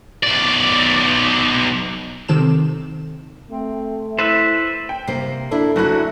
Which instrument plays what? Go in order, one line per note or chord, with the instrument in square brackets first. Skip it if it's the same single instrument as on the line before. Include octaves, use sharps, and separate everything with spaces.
[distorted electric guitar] B1 D5
[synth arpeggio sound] C3 D#3 C4 A4 E7
[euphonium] A3 [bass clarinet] C4
[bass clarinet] E4 [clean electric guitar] A4 B4 [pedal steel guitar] C5 E5
[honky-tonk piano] G5
[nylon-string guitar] C3 A#3 C5 [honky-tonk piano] C7
[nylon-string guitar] A#3 D4 E4 [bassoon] A4
[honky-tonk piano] F#1 F#4 F#6 [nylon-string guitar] F#3 E4